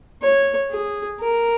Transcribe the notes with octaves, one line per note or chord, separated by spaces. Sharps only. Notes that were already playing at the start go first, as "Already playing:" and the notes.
C#5
G#4
A#4